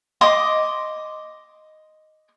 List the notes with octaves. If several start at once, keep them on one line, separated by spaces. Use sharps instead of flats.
D#5 C6 D6 D#6